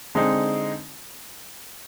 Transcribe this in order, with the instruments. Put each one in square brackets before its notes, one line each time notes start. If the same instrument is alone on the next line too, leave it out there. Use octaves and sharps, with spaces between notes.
[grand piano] D3 G#3 C4 D#4